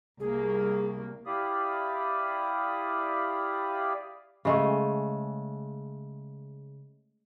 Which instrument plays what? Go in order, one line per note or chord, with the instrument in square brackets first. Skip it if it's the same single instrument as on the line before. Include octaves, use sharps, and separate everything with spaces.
[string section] C2 A#3 [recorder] G#4
[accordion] E4 G4 D5 F5 B5 D#6
[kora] C#3 G#3 A3